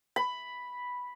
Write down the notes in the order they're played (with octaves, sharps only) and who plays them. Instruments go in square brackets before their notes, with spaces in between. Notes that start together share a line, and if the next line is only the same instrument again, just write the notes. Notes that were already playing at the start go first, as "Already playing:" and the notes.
[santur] B5